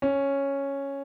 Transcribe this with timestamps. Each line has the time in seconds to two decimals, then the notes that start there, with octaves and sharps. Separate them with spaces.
0.02 C#4